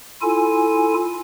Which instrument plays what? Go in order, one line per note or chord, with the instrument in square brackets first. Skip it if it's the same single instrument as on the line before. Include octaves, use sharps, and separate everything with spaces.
[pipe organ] E4 F4 A4 G#5